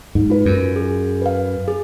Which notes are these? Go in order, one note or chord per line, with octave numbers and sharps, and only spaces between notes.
G#2
F4 B4
F#2
G#4
B4 F5
G#4